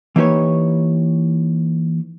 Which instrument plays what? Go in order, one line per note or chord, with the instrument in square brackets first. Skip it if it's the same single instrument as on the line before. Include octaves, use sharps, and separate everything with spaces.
[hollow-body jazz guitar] E3 A#3 D#4 G4 B4 C#5